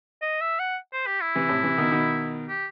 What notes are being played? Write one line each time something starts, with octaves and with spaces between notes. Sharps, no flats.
D#5
E5
F#5
C5
G4
E4
C3 E3
A2 C3
C3 E3
B2 D#3
B2 D#3
G4